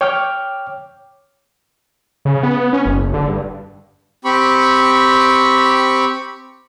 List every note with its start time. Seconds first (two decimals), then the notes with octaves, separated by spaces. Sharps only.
0.01 C#5 G5 D6 F6
2.25 C#3
2.43 B3
2.73 C#4
2.86 F#1
3.14 D3
3.28 G2
4.25 C4 G4 B5 C#6